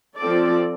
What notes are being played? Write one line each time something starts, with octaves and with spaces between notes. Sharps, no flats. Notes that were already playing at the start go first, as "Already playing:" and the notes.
F3 C4 F4 A4 D5